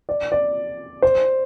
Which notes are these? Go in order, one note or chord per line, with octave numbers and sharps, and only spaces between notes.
D5
D5
C5